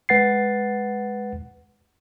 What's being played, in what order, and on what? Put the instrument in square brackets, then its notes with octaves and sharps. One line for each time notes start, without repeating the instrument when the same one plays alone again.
[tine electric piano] G#3 B4 F#5 A6 C7